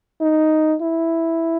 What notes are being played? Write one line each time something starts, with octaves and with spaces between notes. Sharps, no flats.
D#4
E4